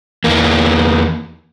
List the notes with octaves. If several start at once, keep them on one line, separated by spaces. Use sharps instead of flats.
E2 A#3